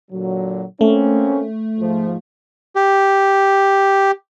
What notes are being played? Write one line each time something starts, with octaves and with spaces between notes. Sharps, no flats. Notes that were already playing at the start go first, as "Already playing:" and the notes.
A#2 D3 F#3
A3 A#3 C4 C#4
G#2 F3
G4